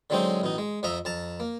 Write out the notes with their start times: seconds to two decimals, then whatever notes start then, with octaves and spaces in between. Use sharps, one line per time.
0.10 D3 F#3 G#3 C4 D#4 C5
0.41 A1 B2 D#4
0.58 G#3
0.83 F2 F3 D#5 E5 A#5
1.05 F2 A5 A#5
1.40 A#3